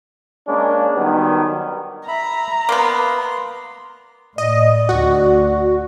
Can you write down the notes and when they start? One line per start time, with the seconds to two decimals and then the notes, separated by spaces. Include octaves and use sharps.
0.47 G#3 A#3 C#4 D4
0.96 D#3 F#3 G3 B3
2.08 E5 A#5 B5
2.69 A#3 B3 C6
4.38 A2 D5 D#5
4.89 D2 F#4